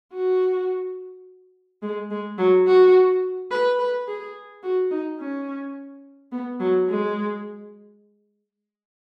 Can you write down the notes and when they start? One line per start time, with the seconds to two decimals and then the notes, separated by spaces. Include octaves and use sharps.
0.14 F#4
1.82 G#3
2.11 G#3
2.38 F#3
2.67 F#4
3.51 B4
3.79 B4
4.08 G#4
4.63 F#4
4.91 D#4
5.19 C#4
6.32 B3
6.60 F#3
6.89 G#3